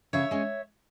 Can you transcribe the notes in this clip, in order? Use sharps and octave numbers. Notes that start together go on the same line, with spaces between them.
C#3 C#5 E5
G#3 C#4